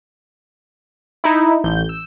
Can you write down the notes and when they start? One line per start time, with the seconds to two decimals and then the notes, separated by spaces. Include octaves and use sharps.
1.24 D#4 E4
1.64 A1 G6
1.89 E6